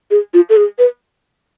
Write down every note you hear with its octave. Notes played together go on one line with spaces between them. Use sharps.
G#4
F4
A4
G#4
B4